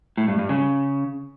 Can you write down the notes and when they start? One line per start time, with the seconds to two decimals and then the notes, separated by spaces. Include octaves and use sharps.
0.17 A2
0.28 G2
0.39 G2
0.49 C#3